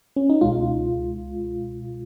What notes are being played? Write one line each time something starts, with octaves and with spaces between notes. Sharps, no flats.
C#4
D#4
C#2 B2 G#3 F4